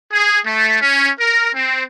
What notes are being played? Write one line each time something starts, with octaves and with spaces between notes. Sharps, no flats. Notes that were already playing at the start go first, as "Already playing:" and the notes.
G#4
A3
C#4
A#4
C4